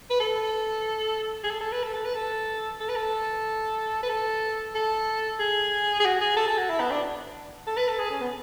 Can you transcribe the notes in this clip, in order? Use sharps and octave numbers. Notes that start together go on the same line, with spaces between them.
B4
A4
G#4
A4
A4
B4
A4
A4
B4
A4
A4
B4
A4
B4
A4
A4
G#4
G#4
F#4
G#4
A4
A4
F#4
E4
B3
D4
A4
B4
A4
G#4
C#4
B3